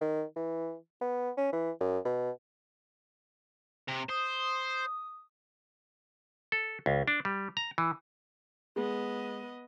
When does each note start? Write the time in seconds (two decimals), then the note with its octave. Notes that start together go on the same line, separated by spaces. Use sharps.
0.01 D#3
0.36 E3
1.01 B3
1.37 C#4
1.53 E3
1.81 F#2
2.05 B2
3.88 C3
4.09 C5 D#6
6.52 A4
6.86 C#2
7.08 D4
7.25 G3
7.57 A#5
7.78 E3
8.76 G#3 B3 D#5